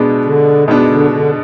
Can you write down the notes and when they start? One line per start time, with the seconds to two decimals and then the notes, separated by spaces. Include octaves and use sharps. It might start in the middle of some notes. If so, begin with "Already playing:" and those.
Already playing: B2 G#3 B3 D4
0.25 D3
0.68 B2 G#3 B3 D4
0.90 D3
1.11 D3